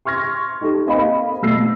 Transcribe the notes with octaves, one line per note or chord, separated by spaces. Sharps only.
C6 C#6 F6 G#6 A#6
D#4 G4 A4
A#3 C4 D#5 F5 B5
B2 A3 E6 A#6 C7